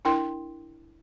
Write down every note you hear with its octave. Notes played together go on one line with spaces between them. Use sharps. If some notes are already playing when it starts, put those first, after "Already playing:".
D4 E4 A#4 G5 C6